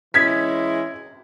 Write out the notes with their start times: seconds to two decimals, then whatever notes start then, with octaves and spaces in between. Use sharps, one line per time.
0.14 E3 G#3 C#4 E4 G#6 B6